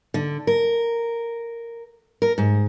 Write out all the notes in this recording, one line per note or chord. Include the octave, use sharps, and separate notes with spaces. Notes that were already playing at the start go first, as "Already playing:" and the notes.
D3
A#4
A#4
G#2